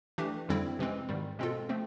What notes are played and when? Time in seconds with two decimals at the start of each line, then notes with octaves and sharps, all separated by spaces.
0.18 E3 A3 D4 G4
0.49 F2 D3 G3 C4 E4
0.79 C3 E3 G#3 C4
1.09 G#2 D#3 G3
1.39 B2 G#3 C4 F4 A4
1.69 F3 A3 C4